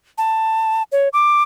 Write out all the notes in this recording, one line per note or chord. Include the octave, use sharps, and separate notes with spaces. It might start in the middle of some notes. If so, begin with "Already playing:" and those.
A5
C#5
D6